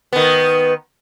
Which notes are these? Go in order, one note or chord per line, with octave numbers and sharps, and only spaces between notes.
D#3 B3